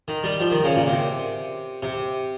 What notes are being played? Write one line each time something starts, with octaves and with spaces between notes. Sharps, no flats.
D#3
G3
F3
D#3
C#3
A#2
C3
C3